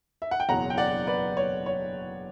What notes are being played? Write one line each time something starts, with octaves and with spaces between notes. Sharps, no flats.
E5
F#5
G5
F#1 E2 B2 F#3 F#5 A#5
G5
D5 F#5
B4 D5
C#5
C#5